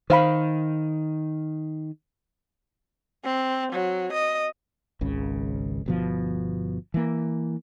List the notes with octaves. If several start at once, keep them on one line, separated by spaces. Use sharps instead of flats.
D#3 C5 F5 B5
C4
F#3
D#5
G#1 C#2 C#3
G1 B2 F3
E3 A#3